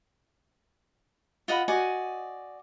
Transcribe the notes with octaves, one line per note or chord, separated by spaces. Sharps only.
F4 D#5 F#5 B5
F#4 D5 D#5 G#5